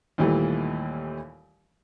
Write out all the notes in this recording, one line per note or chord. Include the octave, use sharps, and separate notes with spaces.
D#2 A#2 E3 G3 A3